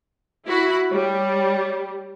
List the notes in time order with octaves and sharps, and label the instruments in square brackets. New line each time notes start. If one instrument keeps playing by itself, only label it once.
[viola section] E4 F#4 B5
[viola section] G3 [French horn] C#5